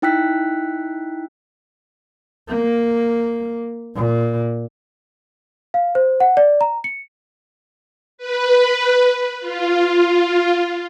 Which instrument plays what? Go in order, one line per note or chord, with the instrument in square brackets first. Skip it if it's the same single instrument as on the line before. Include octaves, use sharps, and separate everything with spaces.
[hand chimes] D#4 E4 G5 E6 F#6 B6
[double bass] A#3
A#2
[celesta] F5
C5
F#5
D5
A#5
C#7
[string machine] B4
F4